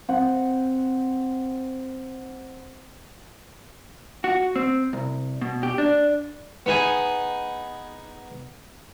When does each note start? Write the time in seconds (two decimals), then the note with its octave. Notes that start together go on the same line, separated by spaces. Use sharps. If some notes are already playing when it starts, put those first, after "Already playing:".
0.09 C4 F#5
4.24 F#4
4.56 C4
4.93 C2
5.41 B2
5.63 G4
5.78 D4
6.66 B3 D#4 G#4 G#5